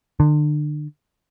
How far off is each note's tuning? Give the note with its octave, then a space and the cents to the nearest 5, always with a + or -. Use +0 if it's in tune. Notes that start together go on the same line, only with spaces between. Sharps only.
D3 +35